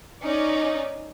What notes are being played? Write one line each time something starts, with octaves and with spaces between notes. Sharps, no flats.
C#4 D#4 D5